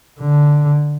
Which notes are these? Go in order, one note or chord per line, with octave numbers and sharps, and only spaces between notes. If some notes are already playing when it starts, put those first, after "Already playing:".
D3